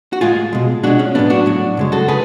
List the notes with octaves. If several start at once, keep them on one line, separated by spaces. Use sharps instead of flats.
F#4
A2 G#3 F4 G#4
B2 G#3
B2 G#3 D4 F#4
C#4
A2 F#3 B3 D4
D4 F#4
A2 F#3
F#2 C#3 G#3
F#4 A4
C#3 G#4 B4